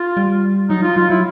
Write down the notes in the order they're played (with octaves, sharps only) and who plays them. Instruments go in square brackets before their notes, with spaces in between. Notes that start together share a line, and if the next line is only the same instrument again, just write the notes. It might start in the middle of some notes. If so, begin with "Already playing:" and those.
Already playing: [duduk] F4
[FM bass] G3
[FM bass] F#3 [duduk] D#4
[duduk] F4
[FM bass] F#3 [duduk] F4
[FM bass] F#3 [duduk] E4